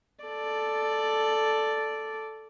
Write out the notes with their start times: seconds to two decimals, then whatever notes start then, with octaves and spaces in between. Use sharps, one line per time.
0.24 A4 D5